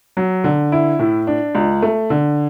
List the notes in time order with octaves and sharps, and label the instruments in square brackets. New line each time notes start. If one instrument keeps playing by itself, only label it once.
[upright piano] F#3
D3
E4
A2
D4
C#2
A3
D3